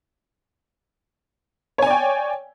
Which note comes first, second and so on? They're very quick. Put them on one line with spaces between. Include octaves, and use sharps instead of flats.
C#5 G#5 D5 G5